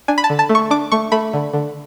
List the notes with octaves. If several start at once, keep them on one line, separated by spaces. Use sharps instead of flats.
D4 G#5
B5
A5
D3
A5
A3
C#6
D4 D6
A3 C#6
A3 B5
D3
D3